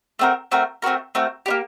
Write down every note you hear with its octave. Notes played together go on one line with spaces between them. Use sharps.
A3 C4 F#4 A#4
A3 C4 F#4 A#4
A3 C4 F#4 A#4
A3 C4 F#4 A#4
A#3 D4 G4